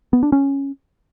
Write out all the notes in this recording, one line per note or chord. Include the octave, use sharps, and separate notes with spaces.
B3
D4
C#4